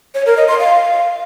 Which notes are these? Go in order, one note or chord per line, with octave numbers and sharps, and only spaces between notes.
C#5
A#4
D#5
C6
F5